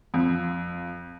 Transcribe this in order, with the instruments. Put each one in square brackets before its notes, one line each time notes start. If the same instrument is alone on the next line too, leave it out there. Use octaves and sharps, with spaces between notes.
[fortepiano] F2